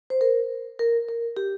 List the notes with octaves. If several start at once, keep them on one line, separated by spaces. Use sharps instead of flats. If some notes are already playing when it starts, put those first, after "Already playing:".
C5
A#4
A#4
A#4
G4